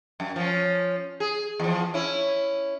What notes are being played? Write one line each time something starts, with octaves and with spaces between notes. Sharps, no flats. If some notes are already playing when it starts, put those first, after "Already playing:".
F#2
F3 C#4
G#4
E2 F3
C#4 E4